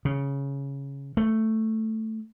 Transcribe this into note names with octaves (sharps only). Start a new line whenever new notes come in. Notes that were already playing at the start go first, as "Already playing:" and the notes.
C#3
A3